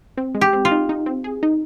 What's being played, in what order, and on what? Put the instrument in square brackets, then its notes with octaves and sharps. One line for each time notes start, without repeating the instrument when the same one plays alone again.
[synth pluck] C4
G#3
[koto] G4
[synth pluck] C4
[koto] F4
[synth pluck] D#4
D#4
C4
G#4
D#4